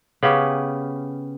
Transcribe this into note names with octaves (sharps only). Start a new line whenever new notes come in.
C#3 B3 C#4 G4